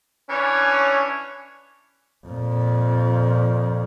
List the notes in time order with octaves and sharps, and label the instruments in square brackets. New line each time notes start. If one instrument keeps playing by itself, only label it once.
[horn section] E3 C#4 D4 C#5
[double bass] F2 A#2